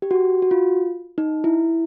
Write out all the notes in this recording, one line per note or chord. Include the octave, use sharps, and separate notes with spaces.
G4
F#4
F#4
F4
D#4
E4